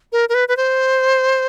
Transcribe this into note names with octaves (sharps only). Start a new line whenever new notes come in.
A#4
A#4
B4
B4
C5